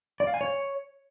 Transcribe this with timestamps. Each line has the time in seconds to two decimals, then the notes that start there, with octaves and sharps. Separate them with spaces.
0.20 D5
0.27 F5
0.34 G#5
0.41 C#5